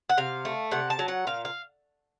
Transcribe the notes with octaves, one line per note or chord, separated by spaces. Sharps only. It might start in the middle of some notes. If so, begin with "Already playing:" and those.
F#5
C3 F5
A3
C3 F#5
A5
F#3
F#5
A#2 F5
F5